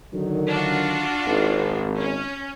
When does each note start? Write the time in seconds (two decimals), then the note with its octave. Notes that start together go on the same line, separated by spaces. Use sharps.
0.14 D3 D#3 F#3
0.49 D4 F4 F#4
1.27 G#1
1.99 C#4